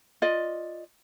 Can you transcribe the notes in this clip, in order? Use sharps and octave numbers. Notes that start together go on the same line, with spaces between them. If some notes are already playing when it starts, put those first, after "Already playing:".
F4 D5 D#5